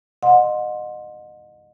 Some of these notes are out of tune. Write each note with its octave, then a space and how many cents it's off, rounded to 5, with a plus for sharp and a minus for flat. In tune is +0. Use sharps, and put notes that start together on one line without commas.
D#5 -25 F#5 -35 C6 +0